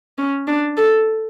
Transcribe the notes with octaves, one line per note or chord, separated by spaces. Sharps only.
C#4
D4
A4